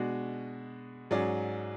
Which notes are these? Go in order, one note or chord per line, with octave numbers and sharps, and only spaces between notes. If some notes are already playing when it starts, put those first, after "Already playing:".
Already playing: B2 G#3 D4 F#4
G#2 F#3 C#4 G#4 D5